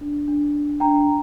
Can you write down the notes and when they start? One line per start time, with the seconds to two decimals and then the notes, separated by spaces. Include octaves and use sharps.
0.01 D4
0.28 D4
0.54 D4
0.80 D4 G5 A#5